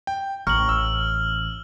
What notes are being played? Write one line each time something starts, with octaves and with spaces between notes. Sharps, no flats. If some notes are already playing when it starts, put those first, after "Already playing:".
G5
A1 A#5 C#6 F6 F#7
E6